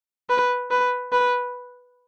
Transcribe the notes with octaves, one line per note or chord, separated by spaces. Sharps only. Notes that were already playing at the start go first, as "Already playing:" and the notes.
B4
B4
B4